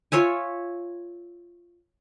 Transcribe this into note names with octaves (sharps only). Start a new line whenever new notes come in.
F4 C#5 E5 G#5